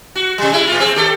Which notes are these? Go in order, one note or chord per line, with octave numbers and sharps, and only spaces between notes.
F#4
C3 G3
G#3 E4
A2 F4
C4 G#4
D#2 G4 A4